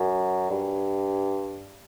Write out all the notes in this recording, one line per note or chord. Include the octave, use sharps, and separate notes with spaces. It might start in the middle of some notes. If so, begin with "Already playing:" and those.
Already playing: F#2
G2